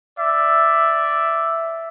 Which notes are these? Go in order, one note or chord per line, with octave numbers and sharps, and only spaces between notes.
D5 E5